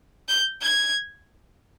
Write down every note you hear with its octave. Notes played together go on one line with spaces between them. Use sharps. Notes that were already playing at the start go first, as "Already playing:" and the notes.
G6
G#6